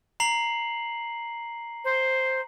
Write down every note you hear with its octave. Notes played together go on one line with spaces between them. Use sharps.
A#5 C7 F#7
C5